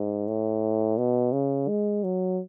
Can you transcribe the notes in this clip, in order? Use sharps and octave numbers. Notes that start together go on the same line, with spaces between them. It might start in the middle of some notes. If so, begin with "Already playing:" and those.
Already playing: G#2
A2
B2
C#3
G#3
F#3